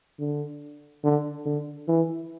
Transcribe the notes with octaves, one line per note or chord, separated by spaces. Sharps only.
D3
D3
D3
E3